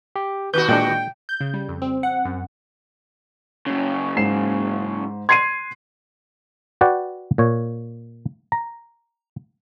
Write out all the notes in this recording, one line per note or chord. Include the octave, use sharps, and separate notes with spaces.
G4
D#2 B2 F#4 B4 G6
A#2 G#3 D4 G5
G6
C#3
G3
F2
C4
F#5
F#2
F#2 C#3
G#2 C7 E7
C6 G#6 C7 D#7
F#4 B4 D5 F#5 G5
A#2 C#5
A#5